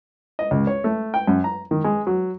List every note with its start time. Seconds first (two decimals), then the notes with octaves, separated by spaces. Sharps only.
0.39 D#5
0.51 C#2
0.67 C#5
0.84 A3
1.14 G5
1.27 F#2
1.44 A#5
1.71 D#3
1.84 G#3
2.07 F#3